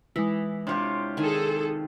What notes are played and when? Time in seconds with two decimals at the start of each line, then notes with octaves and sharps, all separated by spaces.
0.16 E3 G#3 E4
0.67 C3 D4 F4 G4 C#5
1.17 D#3 G#4 A4 G#5